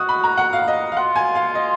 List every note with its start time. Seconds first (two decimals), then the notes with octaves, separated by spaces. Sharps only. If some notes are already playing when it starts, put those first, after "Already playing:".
Already playing: F#4 D#6
0.09 B5
0.24 A#5
0.37 F#5
0.53 F5
0.68 D#5
0.92 F5
0.96 F4 F#5
1.16 G#5
1.35 F5
1.55 D#5